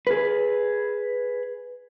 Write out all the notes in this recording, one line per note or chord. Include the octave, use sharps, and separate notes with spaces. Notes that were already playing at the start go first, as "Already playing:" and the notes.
G#4 B4